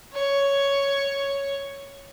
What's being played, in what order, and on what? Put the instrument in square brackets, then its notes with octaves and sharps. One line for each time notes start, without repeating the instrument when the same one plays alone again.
[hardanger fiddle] C#5